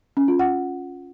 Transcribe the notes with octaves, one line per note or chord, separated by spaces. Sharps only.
C#4
F4
F#5